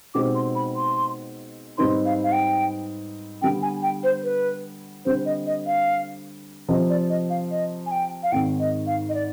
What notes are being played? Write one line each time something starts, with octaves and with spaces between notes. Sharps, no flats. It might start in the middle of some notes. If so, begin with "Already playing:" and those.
B2 G#3 C4 D#4 G4 D6
C6
B5
C6
G#2 G3 C4 D#4 B4 C6
F5
F5
G5
D3 G3 B3 G5
G#5
G5
C5
B4
D3 G3 C4 C5
D#5
D#5
F5
C3 F3 C4 D#5
D5
D#5
F5
D#5
G#5
G5
F5
G#1 G#2 D#3 G5
D#5
F5
D#5
D5